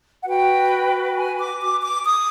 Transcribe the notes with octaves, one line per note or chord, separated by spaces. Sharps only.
F#5
F#4 B4 G5
G#5
D6
D6
D6
D#6